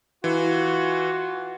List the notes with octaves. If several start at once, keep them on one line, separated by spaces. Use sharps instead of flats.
E3 F4 F#4